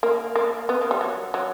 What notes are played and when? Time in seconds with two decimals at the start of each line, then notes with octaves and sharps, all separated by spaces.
0.03 A#3
0.35 A#3
0.69 B3
0.81 A#3
0.91 G3
1.01 F#3
1.34 F#3